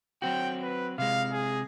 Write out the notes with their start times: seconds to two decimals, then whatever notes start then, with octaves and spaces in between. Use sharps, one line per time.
0.22 F#3 C4 F#4 G5
0.62 B4
0.98 C3 G#3 F5
1.32 G#4